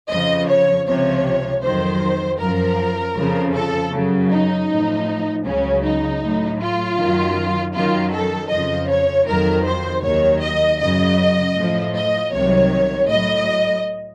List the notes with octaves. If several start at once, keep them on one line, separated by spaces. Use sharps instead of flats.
F2 C#3 F3 D#5
C#5
C#2 C3 F3 C#5
F2 D#3 F#3 C5
F#2 F3 A#4
F2 C#3 F3
A4
F#2 C#3 F#3
D#4
A2 F3
C#2 C#3 F#3 C#4
D#4
A2 F#3
F4
F#2 D#3 F#3
F#2 D#3 F#3 F4
A4
F2 C#3 F3 D#5
C#5
F2 D#3 F#3 A#4
C5
D#2 D#3 F#3 C#5
D#5
F#2 C#3 F#3 D#5
A2 F3
D#5
C2 C3 D#3 F#3 C#5
A2 F#3 D#5